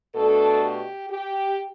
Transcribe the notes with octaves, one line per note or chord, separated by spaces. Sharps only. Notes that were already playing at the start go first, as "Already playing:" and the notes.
B2 A3 D4 A4
G4
G4